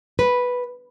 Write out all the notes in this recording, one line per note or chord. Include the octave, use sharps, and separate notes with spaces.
B4